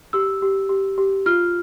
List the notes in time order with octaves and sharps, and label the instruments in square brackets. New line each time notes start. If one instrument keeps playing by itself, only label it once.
[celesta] G4 E6
G4
G4
G4
F4 F6